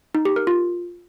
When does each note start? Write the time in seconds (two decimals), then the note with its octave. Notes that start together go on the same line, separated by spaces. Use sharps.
0.15 D#4
0.25 G4
0.36 A#4
0.47 F4